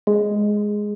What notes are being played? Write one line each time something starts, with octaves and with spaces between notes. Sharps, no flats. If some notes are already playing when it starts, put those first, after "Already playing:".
G#3